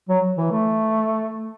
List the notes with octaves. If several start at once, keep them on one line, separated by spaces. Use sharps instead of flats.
F#3
E3
A3